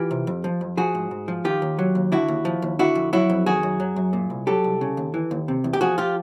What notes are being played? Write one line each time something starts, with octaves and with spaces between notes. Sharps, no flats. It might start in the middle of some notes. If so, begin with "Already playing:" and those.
Already playing: E3 F4 G4
C3
F2
F3
F2
F3 F#4 G#4
G#2
G#2
F3
D#3 F4 G4
D#2
F#3
D#2
D3 E4 F#4
D#2
F3
D#2
D3 E4 F#4
F2
F#3 E4 F#4
F2
D#3 F#4 G#4
F#2
F#3
F#2
A#2
C2
F#3 G4 A4
C2
C#3
D#2
E3
D#2
C3
E2
G4
F3 F#4 G#4
F4 G4